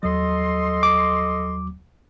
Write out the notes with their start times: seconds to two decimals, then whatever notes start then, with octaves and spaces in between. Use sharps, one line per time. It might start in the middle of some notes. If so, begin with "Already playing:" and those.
0.03 D#2 F#3 A4 D#5 C6
0.83 D6